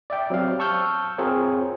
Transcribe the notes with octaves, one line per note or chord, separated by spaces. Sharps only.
D5 E5 G5
F#3 C4 G4 F5
A5 C#6 E6 F6 G6
C4 F4 G#4 A#4 C#5